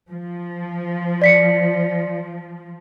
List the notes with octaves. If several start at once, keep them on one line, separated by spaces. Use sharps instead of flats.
F3
D5 B6 C#7